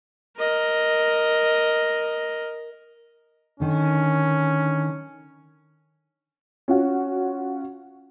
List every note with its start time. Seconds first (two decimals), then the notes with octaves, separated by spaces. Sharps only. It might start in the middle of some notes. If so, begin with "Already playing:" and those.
0.37 A#4 D#5
3.60 D3 D#3 C#4
6.68 C#4 F4 F#4